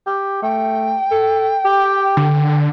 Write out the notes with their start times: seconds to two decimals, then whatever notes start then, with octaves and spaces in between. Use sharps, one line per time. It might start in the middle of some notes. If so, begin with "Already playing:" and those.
0.06 G4
0.42 A3 G5
1.11 A4
1.65 G4
2.17 D3